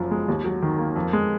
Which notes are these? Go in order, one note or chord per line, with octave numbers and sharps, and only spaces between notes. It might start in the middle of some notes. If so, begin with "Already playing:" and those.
Already playing: F#1 F#2 F3
G#3
D#2
F#3
D#3
A#3
F2
G#3